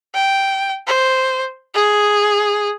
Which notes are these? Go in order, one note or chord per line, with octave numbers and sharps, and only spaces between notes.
G5
C5
G#4